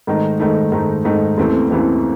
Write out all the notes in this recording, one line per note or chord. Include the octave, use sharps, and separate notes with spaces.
G#2 D#3 A3 D#4
G#2 D#3 A3 D#4
G#2 D#3 A3 D#4
G#2 D#3 A3 D#4
D#2 C#3 E3 A3 C4
D#2 C#3 E3 A3 C4